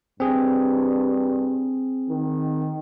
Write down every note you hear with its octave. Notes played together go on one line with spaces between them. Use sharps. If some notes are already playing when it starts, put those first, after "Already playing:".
G2 C4 G#4
D#3